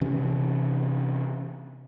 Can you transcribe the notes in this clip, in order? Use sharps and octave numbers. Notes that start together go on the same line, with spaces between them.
C3 E3 C#4